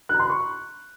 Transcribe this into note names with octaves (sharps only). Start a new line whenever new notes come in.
F#6
A#5
C6
B5
C#6